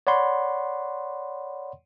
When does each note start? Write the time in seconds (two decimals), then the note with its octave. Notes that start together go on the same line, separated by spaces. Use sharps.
0.07 C#5 D5 F#5 B5 C6